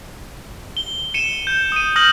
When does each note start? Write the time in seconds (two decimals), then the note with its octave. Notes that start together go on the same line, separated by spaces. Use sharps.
0.77 G7
1.14 C#7 D#7 E7 G7
1.47 G6
1.72 D#6 D#7
1.96 D#6 F6 G6 A#6 F#7